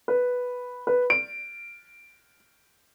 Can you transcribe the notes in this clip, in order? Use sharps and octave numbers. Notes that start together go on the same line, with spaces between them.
B4
B4
D7